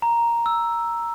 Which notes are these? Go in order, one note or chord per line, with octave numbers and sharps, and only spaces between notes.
A#5
E6